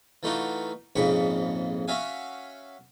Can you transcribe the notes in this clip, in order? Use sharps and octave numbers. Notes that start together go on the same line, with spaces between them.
E3 A3 D#4 F4 F#4
A#1 F2 G#2 C#3 B5 C#6
C#4 F#4 E5 F5 G#5